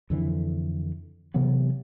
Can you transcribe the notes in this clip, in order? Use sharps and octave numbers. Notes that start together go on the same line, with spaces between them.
F2 D3 E3
C3 E3 F#3 B3